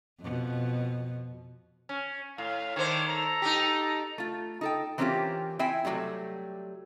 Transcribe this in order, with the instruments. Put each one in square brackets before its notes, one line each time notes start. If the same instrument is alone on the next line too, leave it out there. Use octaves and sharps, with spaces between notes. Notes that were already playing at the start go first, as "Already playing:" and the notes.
[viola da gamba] F2 B2
[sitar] C#4
[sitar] A2 [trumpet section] F5
[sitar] D#3 C5 [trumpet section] D4 E4 C#5
[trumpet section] A4 A#5
[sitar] D#4 G4
[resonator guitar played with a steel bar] A3 F4
D#4 A4 G5
E3 A#3 C4 C#4 F4 G4
C4 E4 E5 G5 G#5
C3 E3 F#3 G3 A3